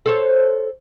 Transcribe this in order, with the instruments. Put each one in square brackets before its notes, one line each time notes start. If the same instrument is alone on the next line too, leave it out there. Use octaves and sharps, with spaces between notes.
[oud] A4 C5 C#5